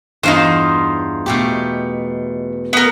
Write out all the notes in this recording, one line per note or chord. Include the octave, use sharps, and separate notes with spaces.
E2 G2 D#4 F4 C5
B2 A3 G4
B3 A#4